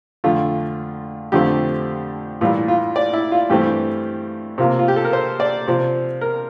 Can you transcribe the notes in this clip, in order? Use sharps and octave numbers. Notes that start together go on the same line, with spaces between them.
F2 D3 A3 F4
F2 D3 F3 A3 C4 G4
A2 E3 G3 A#3 F4
F4
D5
E4
F4
G2 E3 A3 C4 G4
C3 F3 A#3
F4
G4
A4
A#4
C5
D5
C3 F3 C4
A#4